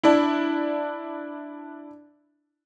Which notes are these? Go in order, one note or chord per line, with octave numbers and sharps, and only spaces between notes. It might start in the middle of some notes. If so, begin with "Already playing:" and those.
D4 E4